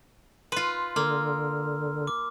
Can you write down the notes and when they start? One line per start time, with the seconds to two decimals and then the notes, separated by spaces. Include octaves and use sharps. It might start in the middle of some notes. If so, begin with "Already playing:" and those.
0.52 F4 B4 C6
0.96 D3 A#3 E6 F6
2.07 D6